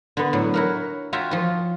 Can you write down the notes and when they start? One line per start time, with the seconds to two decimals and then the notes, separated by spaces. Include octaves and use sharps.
0.17 D3 B3
0.33 A2 F#3
0.54 E4 F#4 A#4
1.13 F4 F#4 C#5 E5 G5 A#5
1.31 F3 F4